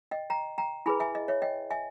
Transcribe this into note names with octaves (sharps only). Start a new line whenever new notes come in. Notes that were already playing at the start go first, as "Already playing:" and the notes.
D#5 G5
G5 A#5
G5 A#5
E4 G#4 B4 G#5 B5
E5 G#5
D#5
C#5 E5
D#5 G5
E5 G#5